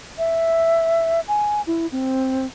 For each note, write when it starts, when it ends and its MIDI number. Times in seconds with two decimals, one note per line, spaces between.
0.18 1.20 76
1.28 1.62 80
1.67 1.87 64
1.92 2.47 60